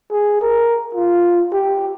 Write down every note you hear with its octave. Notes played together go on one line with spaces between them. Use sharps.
G#4
A#4
F4
G4